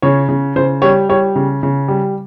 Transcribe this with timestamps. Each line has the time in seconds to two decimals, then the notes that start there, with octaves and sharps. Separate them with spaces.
0.02 C#3 C#5
0.29 C#3
0.56 C#3 C5
0.82 G3 C#5
1.09 G3 C#5
1.36 C#3
1.63 C#3
1.88 G3